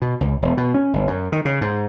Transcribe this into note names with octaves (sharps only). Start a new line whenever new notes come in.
B2
C#2
E1
B2
C#4
G1
F#2
D#3
C#3
G#2